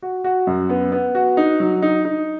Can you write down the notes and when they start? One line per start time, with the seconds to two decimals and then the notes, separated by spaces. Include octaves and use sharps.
0.02 F#4
0.24 F#4
0.47 F#2
0.70 B3
0.92 B3
1.15 F#4
1.37 D#4
1.60 F#3
1.82 D#4
2.05 D#4